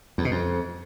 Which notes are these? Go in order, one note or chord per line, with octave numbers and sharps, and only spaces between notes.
E2
B2
F2